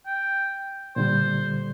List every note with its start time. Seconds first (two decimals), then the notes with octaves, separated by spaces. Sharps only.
0.06 G5
0.96 A#2 D3 G3 C5